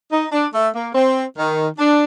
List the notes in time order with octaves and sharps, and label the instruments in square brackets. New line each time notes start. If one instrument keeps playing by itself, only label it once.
[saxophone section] D#4
D4
A3
A#3
C4
D#3
D4